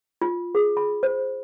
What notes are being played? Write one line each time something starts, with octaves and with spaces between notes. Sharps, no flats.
F4
G#4
B5
C5